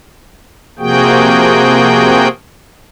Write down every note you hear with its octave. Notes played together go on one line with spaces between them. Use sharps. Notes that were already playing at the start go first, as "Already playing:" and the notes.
C3 F3 A#3 F#4 G#4 G5